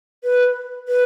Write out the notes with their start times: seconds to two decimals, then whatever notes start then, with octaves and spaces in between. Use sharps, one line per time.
0.24 B4
0.88 B4